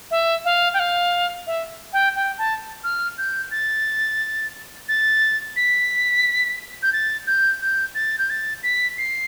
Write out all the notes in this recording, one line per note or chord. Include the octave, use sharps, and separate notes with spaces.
E5
F5
G5
F5
E5
G5
G5
A5
F6
G6
A6
A6
B6
G6
A6
G6
G6
A6
G6
A6
B6
C7